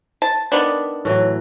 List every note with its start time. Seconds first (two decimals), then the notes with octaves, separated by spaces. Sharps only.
0.22 A5
0.52 D#3 B3 D4
1.05 A2 E3 F#3